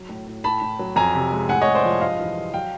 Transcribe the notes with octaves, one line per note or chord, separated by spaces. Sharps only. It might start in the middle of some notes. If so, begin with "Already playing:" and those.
Already playing: F#3
A2
A2
A2 A5 B5
A2
F#3
F2 G#5 A#5
C3
G#3
A2 F#5 G#5
C#5 D#5
G#3
C5 D5
F3
G2 D#5 F5
E3
G2
F#3 F5 G5